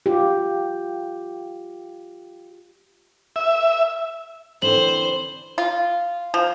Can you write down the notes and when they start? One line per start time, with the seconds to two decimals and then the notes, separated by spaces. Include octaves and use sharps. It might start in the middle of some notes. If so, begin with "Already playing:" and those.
0.06 F4 G4
3.36 E5
4.62 D3 E3 C4 C5 F#7
5.58 F4
6.34 F3